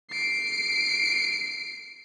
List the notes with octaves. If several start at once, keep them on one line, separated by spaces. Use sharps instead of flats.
C7 D7